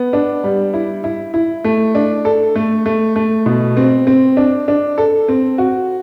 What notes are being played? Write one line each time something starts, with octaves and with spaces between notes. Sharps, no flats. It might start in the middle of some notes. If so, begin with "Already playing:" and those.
Already playing: B3
D4
G3
E4
E4
E4
A3
D4
A4
A3
A3
A3
B2
C4
C4
D4
D4
A4
C4
F#4